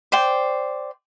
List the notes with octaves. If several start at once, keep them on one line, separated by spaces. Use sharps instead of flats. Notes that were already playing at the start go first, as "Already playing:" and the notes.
C5 D5 G5